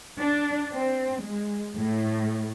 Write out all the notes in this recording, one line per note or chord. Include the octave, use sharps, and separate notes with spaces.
D4
C4
G#3
A2